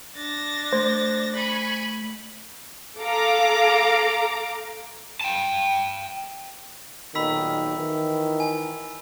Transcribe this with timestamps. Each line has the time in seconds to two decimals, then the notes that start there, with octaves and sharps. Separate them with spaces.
0.15 D4 A6 A#6
0.73 A3 C5 G#6
1.35 G#5 B5 C#6
3.01 A4 F5 A#5 D6
5.21 G5 A5
7.15 B1 A#2 D#3 B5 E6 B6
7.78 D#3 E3
8.40 G#5